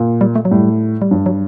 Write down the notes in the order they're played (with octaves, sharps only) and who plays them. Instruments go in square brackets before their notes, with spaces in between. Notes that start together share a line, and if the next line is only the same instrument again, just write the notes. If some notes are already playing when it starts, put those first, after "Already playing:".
Already playing: [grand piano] A#2
[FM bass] G3
A3
F#3
[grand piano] A2 [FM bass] G3
[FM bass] G3
[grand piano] G2 [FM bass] F#3
[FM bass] F#3